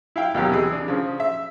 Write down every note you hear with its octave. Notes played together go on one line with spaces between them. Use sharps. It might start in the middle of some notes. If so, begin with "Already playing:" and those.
E4 F5 G5
D#2 B2 F#3 G4
C3 E3 G#4
D4
C#3 F3
E5